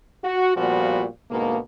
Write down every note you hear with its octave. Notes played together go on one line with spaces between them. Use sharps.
F#4
A#2 F3 G3 B3 F#4
D2 G#2 B2 A#3